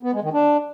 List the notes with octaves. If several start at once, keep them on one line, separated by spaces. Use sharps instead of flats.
B3
G#3
D#3
D4